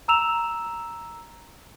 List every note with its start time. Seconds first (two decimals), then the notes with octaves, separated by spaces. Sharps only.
0.08 A#5 E6 E7 F7